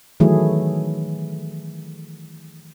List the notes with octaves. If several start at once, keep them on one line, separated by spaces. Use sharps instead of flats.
D#3 E3 F#3 A3 E4 G#4